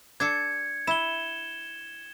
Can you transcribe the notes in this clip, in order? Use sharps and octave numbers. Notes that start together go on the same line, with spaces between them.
D4 A4 G#6 C#7
E4 E7 G7